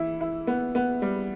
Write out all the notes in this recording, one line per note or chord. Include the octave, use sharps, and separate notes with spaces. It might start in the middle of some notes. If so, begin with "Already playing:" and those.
Already playing: E3 E4
E4
B3
B3
G3